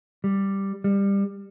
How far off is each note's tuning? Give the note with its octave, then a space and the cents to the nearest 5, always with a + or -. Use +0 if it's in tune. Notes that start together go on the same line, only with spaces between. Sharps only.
G3 +0
G3 +20